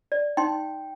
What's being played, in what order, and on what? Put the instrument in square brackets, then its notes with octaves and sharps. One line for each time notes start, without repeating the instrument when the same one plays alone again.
[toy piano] D5
[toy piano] D#4 C6 [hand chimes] G5